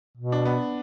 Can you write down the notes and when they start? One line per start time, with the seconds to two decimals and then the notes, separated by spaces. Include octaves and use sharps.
0.17 B2
0.32 D4
0.45 B3